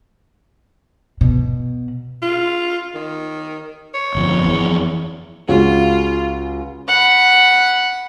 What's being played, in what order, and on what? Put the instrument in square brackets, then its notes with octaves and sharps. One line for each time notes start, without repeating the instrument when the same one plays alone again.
[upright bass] B2
[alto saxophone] F4
D#3
C#5
[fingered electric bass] G1 F2
F2 E3
[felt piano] C#2 C#3 F#4 [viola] F4
[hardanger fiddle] F#5 B5